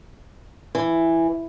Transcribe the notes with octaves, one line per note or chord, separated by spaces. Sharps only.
E3